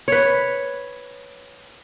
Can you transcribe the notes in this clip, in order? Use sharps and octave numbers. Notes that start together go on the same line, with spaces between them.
B4 C#5